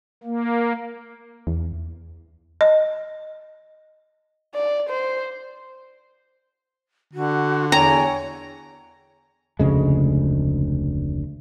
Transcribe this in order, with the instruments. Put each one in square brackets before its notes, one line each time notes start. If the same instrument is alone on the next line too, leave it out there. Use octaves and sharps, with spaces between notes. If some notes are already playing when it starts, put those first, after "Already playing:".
[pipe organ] A#3
[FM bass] E2
[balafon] D#5
[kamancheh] D5
C5
[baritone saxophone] D3 [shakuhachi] F#4
[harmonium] E2 G5 G#5 [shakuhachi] C#5 [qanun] A#5
[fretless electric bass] F1 D2 C#3 G#3